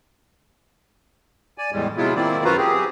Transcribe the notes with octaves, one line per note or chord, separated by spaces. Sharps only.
D5 G#5
E2 A2 G3 G#3
C3 F#3 G#3 B3 E4 F4
D#3 A#3 C4 E4 D5
F#2 F4 F#4 B4 C5 A#5
C4 G4 G#4